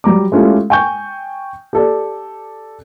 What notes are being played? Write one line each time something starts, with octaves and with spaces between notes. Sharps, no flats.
F#3 G3 A#5 D6
G#3 A3 C#4 E4 F4 G4
G5 G#5 C#6 G6
G4 A4 D5